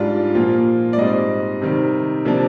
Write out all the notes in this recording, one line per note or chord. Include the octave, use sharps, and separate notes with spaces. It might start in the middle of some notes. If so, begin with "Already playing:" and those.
Already playing: G#2 G3 D4 F4 D5
A#2 F3 A#3 F4
D5
G#2 G3 C4 D#5
C3 D#3 G3
C3 F3 A#3 D4